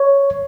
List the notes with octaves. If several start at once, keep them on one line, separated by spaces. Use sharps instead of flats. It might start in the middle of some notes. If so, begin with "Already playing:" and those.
Already playing: C#5